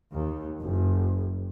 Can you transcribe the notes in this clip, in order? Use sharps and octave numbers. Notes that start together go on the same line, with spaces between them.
D#2
F#1